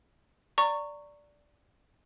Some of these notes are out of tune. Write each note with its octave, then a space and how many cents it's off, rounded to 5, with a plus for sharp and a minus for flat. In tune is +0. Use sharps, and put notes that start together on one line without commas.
D5 -5 A#5 -25 C#6 +0